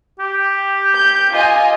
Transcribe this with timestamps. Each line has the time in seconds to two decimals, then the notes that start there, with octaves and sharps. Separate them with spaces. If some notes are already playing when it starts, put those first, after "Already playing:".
0.20 G4
0.94 G6
1.31 F4 D#5 G#5